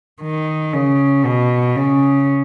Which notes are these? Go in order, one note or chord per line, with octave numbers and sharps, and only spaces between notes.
D#3
C#3
B2
C#3